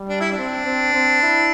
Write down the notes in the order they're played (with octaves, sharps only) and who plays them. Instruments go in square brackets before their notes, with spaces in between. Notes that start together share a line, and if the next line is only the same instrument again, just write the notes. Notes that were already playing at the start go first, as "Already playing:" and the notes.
Already playing: [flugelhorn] G3
[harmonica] D4
E4
D4
[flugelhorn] C4
C4
C4
E4